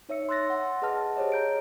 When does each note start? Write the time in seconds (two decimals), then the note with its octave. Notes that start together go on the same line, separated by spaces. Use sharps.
0.09 D#4 C#5 E5 E6 C#7
0.29 C6 E6 F#6 A6 A#6
0.50 F#5 C6
0.82 G#4 B4 D#5 F#5 A5 F6
1.17 G4 G#4 C5 C#5 D#5
1.32 A#5 G6 D7